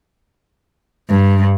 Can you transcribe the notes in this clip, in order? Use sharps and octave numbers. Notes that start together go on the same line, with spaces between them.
G2